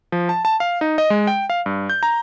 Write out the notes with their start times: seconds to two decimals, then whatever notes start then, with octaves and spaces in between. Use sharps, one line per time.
0.12 F3
0.29 A5
0.45 A5
0.60 F5
0.81 D#4
0.98 D#5
1.10 G#3
1.27 G5
1.50 F5
1.66 G2
1.90 G6
2.03 A#5